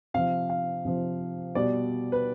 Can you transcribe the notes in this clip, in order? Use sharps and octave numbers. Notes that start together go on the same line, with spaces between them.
C3 F3 F5
F5
C3 F3
B2 G3 D5
B4